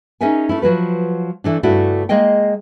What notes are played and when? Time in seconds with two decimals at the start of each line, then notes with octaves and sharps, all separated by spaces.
0.21 C#4 D#4 G#4 A#4 E5 G#5
0.49 A3 C#4 E4
0.62 F3 F#3 F#4 B4
1.44 E3 A3 D4
1.63 G2 C#3 A3 D4 E4 F#4
2.09 G#3 A#3 G#4 D#5 G5